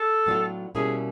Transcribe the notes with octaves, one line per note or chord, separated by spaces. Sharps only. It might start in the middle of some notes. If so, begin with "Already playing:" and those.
Already playing: A4
A2 F#3 B3 D4 F4
B2 G3 A#3 C#4 E4 G#4